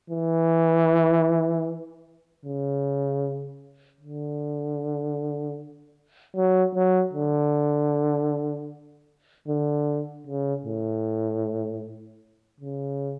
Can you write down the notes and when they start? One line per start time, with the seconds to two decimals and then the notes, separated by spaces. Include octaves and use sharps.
0.10 E3
2.45 C#3
4.01 D3
6.36 F#3
6.75 F#3
7.13 D3
9.48 D3
10.27 C#3
10.65 A2
12.60 C#3